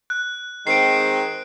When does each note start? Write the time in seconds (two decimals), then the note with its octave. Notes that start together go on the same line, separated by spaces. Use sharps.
0.10 F#6
0.67 D#3 G#3 C4 C7 D7